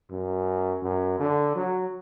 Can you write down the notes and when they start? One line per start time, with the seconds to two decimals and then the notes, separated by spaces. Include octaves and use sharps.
0.11 F#2
0.82 F#2
1.19 D3
1.55 F#3